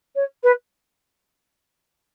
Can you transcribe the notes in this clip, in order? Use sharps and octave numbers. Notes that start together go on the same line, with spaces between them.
C#5
B4